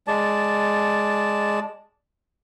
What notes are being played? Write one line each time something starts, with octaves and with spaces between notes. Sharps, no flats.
G#3 D5 A5